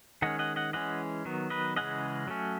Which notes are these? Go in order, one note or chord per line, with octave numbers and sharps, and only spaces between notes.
D#3 G#3 C#4 D#5 F#5
D#5 F#5
D#5 F#5
E3 G#3 C#4 D#5 F#5
D#3 F#3 B3
B4 D#5
C#3 E3 G#3 C#4 D#5 F#5
F#3 A3 C#4